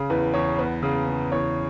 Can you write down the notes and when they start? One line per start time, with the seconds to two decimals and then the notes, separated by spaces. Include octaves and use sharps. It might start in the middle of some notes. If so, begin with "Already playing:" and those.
Already playing: C#3
0.10 E2 B4
0.34 E2 C#5
0.58 B3 B4
0.83 C#3
1.07 C#3
1.32 E2 C#5